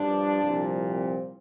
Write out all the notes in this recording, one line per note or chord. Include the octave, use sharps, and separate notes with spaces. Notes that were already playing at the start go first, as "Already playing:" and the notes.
Already playing: G2 F3 D4
C2 A#2 F3
C4